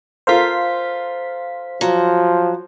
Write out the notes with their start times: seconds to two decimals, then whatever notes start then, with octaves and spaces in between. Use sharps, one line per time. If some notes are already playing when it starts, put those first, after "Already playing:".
0.27 F4 A4 A#4 C5 F5 B6
1.81 F3 F#3